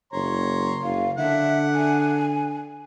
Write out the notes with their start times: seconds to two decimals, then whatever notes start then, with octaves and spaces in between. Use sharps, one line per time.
0.13 F#1 C#5 A#5 C6
0.83 F#1 F5
1.18 D3 D4 E5 F#5
1.74 G#5